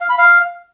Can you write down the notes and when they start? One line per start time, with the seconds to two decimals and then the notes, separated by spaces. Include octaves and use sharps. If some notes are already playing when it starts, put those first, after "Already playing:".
0.01 F5
0.09 B5
0.18 F5